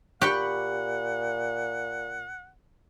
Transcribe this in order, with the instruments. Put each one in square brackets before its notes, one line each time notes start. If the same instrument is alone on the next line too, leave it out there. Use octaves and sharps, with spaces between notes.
[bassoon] A#2 [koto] G4 [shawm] F#5 [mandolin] B5 C#6 F#6